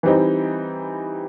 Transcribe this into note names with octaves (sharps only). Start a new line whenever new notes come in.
E3 G3 C4 D#4